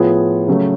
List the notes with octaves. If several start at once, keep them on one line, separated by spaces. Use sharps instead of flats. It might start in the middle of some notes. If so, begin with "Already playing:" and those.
Already playing: A2 F3 B3 F4 G#4
C#3 F#3 A3